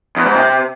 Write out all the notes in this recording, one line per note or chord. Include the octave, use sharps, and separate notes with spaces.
E2
G#2
C3